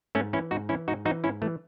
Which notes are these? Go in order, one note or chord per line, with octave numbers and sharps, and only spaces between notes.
G#2 A3 C#4
E3 C#4 E4
G#2 D#4 F#4
E3 C#4 E4
G#2 D#4 F#4
E3 D#4 F#4
G#2 C#4 E4
E3 A3